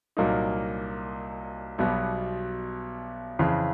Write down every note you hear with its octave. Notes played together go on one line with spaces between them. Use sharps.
C2 A#2 F#3 A#3 D#4
B1 B2 G3 B3
F2 C#3 E3